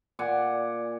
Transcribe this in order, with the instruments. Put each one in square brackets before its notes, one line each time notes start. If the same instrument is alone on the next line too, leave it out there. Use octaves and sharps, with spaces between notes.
[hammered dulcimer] A#2 D5 F#5 G#5